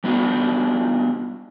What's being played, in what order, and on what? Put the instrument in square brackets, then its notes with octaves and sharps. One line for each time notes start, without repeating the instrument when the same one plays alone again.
[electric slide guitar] G3 B3 D4 D#4 F#4